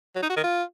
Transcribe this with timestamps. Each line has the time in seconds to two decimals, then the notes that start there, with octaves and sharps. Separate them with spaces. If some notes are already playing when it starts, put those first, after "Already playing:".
0.15 F#3
0.22 D#4
0.29 F#4
0.36 D#3
0.44 F4